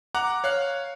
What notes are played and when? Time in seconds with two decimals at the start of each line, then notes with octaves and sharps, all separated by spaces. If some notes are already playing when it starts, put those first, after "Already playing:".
0.14 F#5 A#5 D6 F#6
0.44 C#5 F5 F#6